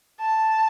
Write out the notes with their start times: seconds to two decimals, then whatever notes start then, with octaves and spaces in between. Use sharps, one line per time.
0.19 A5